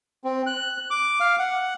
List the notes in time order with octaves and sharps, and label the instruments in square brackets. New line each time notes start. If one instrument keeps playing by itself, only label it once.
[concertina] C4
F#6
D6
F5
F#5